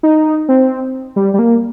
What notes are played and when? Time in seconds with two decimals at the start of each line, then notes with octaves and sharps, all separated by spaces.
0.03 D#4
0.49 C4
1.16 G3
1.34 G3
1.39 A#3